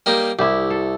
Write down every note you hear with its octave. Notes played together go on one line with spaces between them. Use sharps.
G3 A#3 D#4
C2 E4 G4
A4